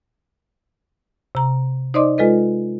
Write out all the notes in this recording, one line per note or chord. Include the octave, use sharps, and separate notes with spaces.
C3 A#5
D#4 C5 D5 D#5 C6 D6
G#3 F4 A4 B4 D#5